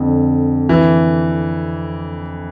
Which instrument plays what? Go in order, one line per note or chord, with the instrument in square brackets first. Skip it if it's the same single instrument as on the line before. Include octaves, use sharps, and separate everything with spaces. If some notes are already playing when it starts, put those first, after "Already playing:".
Already playing: [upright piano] F2 D3
[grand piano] E3